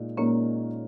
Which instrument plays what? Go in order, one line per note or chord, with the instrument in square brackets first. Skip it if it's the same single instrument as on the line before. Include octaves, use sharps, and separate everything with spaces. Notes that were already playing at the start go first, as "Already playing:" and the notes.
Already playing: [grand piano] A#2 G#3 D#4
[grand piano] A#2 G#3 D#4 A#4 C#5 [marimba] A#3 C#4